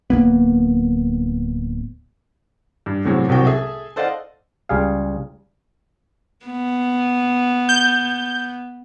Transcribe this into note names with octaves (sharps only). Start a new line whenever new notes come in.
D1 F2 A#3 B3
G2
E2 A2 C3 F#3 G#3
E1 C2 C3 F#3 F#4 G5
G#4 A4 E5 G#5
A4 C5 D5 D#5 F5 F#5
C#2 G3 G#4 F5
B3
G6